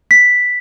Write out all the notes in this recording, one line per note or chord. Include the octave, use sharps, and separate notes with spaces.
B6